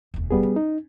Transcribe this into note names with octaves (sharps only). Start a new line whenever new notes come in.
E1 D2
G3 B3 G#4
C#4
D#4